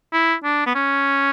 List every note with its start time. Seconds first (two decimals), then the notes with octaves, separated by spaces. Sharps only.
0.13 E4
0.44 D4
0.66 B3
0.75 C#4